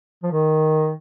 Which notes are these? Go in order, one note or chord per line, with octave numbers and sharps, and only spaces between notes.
F3
D#3